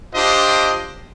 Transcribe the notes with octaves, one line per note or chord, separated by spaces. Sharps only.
D4 F4 G4 C5 D#5